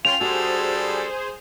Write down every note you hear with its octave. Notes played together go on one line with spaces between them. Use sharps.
C#4 F4 G5 C6 F7
G3 D4 F#4 G#4 A4 C5